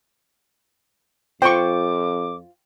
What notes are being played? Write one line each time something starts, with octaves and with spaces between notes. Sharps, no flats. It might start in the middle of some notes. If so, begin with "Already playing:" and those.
F2 F4 C5 G5 C#6 D6